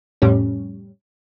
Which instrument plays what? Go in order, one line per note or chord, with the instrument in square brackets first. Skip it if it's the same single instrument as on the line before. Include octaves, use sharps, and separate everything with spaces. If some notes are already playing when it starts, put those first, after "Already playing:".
[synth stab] F2 A2 G3 C#4